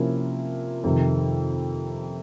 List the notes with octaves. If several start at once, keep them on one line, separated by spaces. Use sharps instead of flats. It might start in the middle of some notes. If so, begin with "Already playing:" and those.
Already playing: C3 F3 A#3 C#4 E4
F2 C3 D#3